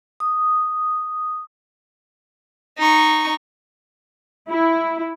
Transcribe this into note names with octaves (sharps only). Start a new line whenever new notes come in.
D#6
D#4 C#6
E4